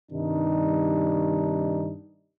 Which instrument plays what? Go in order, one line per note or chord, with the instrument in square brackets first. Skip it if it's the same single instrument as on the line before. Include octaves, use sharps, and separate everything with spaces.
[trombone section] G2 C3 D#3 G3 D4 D#4